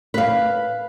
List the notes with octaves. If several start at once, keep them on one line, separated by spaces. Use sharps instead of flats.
B4 F5